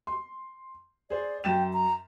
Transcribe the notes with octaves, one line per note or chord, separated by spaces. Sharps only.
C6
G#4 C5 D5
F#2 G5 A6 E7
A#5